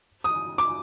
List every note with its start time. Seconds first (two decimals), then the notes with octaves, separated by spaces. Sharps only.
0.24 D#6
0.58 D6